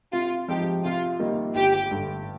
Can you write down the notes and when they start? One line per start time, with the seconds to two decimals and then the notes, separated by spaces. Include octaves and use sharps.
0.13 C3 F4
0.48 F3 G#3 C4 D#4 G4
0.84 C3 F4
1.19 D#3 G3 A#3 D#4
1.55 G1 G4
1.91 G2 D3